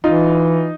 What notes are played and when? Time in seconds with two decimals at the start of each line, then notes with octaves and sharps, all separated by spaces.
0.04 E3 D#4 F4